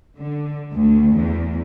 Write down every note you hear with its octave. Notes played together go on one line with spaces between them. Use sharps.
D3
D2
E2